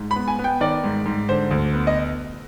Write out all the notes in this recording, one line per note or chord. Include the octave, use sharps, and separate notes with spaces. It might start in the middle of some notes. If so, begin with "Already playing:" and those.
Already playing: G#2
B3 B5
G#5
B3
G5
D#3 D5
G#2
G#2
D3 C5
D2
B3
D#5